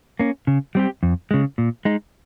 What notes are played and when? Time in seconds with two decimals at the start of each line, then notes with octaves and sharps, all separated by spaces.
0.19 A#3 C#4
0.47 C#3
0.75 G3 C4 G4
1.03 F2
1.31 C#3 G#3
1.58 A#2
1.85 G#3 D#4